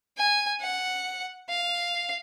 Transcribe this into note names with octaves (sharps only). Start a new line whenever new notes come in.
G#5
F#5
F5